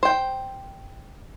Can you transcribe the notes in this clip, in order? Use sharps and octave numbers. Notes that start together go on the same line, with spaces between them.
C5 G5